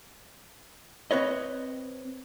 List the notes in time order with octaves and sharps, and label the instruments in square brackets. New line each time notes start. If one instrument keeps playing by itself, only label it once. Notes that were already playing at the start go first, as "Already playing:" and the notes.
[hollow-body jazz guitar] C4 B4 C#5 D#5